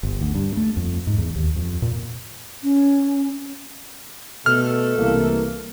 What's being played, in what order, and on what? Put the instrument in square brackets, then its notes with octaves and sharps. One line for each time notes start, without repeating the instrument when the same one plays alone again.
[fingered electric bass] G1
D2
G2
A3
F2
G#2
E2
D#2
F2
A#2
[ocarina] C#4
[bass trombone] B2 [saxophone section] A3 A4 [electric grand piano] F6
[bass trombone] C2 [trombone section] E3 A#3